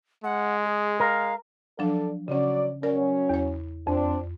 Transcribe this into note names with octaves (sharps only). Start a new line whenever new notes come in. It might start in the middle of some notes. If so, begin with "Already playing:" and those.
G#3 F#5
G#4
A#4 F5
F3 F#3 D4 A4 D5
C#3 F#3 C#4 D5
F#3 C#4 A#4 D5
E2 C#5
F2 C4 D4